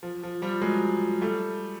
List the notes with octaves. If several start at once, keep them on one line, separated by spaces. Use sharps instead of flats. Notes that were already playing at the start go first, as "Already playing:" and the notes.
F3
F3
F3 G3
F#3 G#3
G3 A3